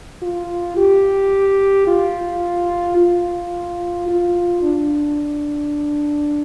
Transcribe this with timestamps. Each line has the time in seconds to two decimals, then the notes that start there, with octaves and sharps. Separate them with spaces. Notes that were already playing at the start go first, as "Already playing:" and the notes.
0.22 F4
0.77 G4
1.87 F4
2.97 F4
4.08 F4
4.62 D4